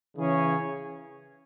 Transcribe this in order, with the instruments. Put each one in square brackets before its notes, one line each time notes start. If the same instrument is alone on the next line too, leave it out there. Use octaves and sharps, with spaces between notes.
[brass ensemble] C#3 E3 C#4 G#4 C#5